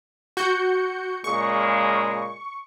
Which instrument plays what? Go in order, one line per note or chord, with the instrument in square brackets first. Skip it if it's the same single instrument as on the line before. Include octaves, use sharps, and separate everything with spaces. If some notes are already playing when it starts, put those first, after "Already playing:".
[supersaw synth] F#4 G6 C#7
[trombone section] A#2 C#3 G#3 [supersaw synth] C#6